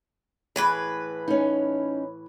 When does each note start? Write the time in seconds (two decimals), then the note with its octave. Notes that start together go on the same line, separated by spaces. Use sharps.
0.56 A2 E3 G#4 B4
1.28 C#4 D#4